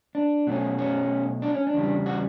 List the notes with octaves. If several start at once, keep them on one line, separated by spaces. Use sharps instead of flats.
D4
B2 F#3 A3 C#4
C#4
D4
C#4
D4
E2 C#3 G3
F#4